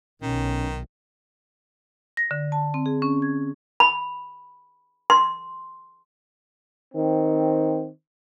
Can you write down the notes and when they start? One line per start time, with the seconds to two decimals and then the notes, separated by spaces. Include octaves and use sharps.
0.22 B1 D#3 C#4
2.17 A#6
2.31 D3
2.52 A5
2.74 C4
2.86 G#4
3.02 C#4
3.22 G#6
3.80 B5
5.10 C6
6.95 D#3 C4